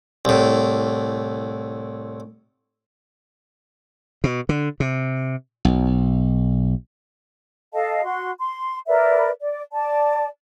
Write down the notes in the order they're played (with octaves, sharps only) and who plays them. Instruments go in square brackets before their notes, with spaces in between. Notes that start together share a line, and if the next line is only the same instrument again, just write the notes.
[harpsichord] C2 A2
[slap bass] B2
D3
C3
B1
[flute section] A4 D#5 F5 A5
F#4 C6
C6
A#4 B4 D5 E5
D5
D5 A5